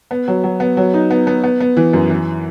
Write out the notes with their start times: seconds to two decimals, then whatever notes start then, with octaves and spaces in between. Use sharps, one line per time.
0.11 B3
0.28 F#3
0.44 F#3
0.60 B3
0.77 F#3
0.94 D#4
1.11 B3
1.27 B3
1.44 B3
1.60 B3
1.77 E3
1.93 F#2
2.10 E3